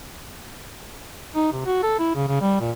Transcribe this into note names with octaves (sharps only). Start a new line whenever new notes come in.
D#4
C3
F#4
A4
E4
C#3
C#3
G3
A#2